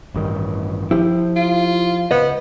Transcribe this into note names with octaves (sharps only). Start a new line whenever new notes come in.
A1 G2 D#3
F3 E4 G4
F4
C#2 B3 C5 D#5